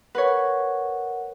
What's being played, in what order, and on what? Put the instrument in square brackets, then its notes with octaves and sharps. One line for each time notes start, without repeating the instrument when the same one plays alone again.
[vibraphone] A#4 F#5 [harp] B4 C#5